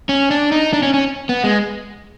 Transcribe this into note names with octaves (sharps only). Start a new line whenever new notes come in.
C#4
D4
D#4
D4
C#4
C#4
B3
G#3